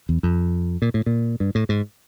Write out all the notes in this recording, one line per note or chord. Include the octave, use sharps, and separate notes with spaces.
E2
F2
A#2
A2
A#2
G2
A2
G#2